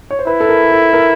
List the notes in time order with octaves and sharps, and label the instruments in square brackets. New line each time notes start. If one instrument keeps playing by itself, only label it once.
[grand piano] C#5
C5
[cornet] E4 [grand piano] B4
[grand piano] A4
A#4
A4
A#4